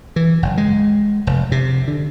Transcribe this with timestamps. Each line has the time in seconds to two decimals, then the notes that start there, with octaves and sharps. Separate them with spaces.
0.16 E3
0.42 F#1
0.57 G#3
1.27 F1
1.52 C3
1.88 D3